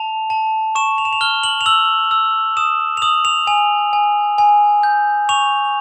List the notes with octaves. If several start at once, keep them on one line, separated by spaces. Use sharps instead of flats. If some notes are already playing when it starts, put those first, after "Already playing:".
Already playing: A5 F7
A5
C#6 E7
F7
E7
F7
F6 G7
F#7
F7
E6 F#7
E6
D#6 E7
F7
D#6 F#7
F7
G#5 F7
G#5
G#5
G6
C#6 F7